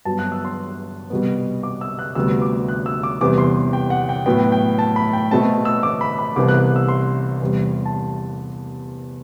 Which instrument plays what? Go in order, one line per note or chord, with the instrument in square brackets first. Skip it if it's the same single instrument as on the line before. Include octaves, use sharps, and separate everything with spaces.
[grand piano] G2 F#3 B3 A5
F#6
E6
C6
C2 B2 G3 B3
D6
E6
F#6
D2 C3 G3 B3 E6
D6
F#6
E6
D6
E2 C3 G3 B3 D6
C6
G5
F#5
G5
A2 F#3 B3 G5
G5
A5
B5
G5
B2 A3 C4 A5
E6
D6
B5
B5
C2 C3 E3 B3 D6
F#6
E6
C6
E2 C3 G3
A5